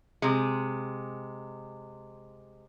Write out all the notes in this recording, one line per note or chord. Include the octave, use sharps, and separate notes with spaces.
C3 G#3